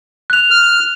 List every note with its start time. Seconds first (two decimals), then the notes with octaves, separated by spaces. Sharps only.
0.30 F#6 F7
0.51 F6